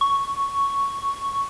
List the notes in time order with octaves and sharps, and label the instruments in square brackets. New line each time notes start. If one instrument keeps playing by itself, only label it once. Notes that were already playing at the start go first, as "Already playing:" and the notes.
[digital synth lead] C#6